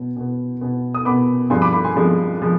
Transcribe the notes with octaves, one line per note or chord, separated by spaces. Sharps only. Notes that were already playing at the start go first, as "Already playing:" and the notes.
Already playing: B2 B3
B2 B3
B2 B3
D#6
B2 B3 B5 D6
G2 F3 G#3 C4 G#5 C6
B5 D6
B5 D6
G#5 C6
G2 F3 G#3 C4
F3 G#3